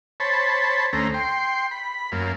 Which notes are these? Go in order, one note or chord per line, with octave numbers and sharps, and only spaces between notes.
C5 C#5 A5 B5
D2 A3 C#4 C5 A#5
G5 C6
B5
F#2 A#3